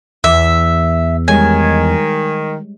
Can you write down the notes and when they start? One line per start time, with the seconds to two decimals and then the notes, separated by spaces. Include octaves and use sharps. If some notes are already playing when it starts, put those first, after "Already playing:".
0.24 E2 E5
1.28 D#3 G3 G#3 C#5 G#5